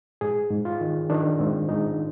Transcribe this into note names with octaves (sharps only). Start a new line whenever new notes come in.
G#2 G#4
G#2
F4
D#3
D#3 D4
G#2 C4
G#2 D#4